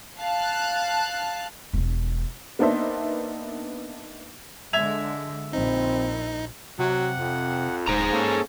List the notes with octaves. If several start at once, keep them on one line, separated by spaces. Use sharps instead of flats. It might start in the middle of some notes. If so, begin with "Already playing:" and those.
F5 A5 F#6
E1 D4
A#3 B3 D4 D#4 C5 E5
D3 G#3 E5 G#6 F7
A#1 C4 D#4
C3 F#3 F#5
F2
D#1 G#2 G#4 C5 A#5
A#3 C#4 A4